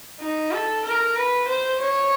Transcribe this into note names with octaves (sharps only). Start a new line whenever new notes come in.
D#4
A4
A#4
B4
C5
C#5